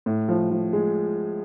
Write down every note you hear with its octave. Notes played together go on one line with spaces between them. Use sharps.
A2
F3
F3
G#3